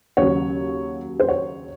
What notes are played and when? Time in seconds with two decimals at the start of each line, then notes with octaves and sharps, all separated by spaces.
0.17 D#2 C#3 F#3 C#5
1.20 C5
1.28 C#5